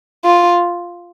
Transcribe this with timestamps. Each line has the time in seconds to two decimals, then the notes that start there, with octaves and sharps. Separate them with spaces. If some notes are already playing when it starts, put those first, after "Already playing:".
0.25 F4